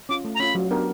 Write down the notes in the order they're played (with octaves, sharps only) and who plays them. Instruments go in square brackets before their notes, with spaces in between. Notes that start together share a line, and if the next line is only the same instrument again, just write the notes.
[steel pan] C#4 F4 [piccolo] D6
[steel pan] A3
[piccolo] A#5
[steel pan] C#4 F4 [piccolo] B5
[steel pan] F#3
B3 D4 G4 A#4